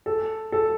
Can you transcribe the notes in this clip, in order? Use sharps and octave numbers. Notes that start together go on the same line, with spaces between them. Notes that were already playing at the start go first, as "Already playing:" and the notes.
A4
A4